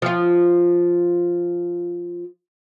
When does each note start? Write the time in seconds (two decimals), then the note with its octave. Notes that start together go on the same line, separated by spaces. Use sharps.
0.02 F3 F4